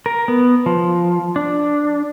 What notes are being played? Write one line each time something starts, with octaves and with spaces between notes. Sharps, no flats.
A#4
B3
F3
D4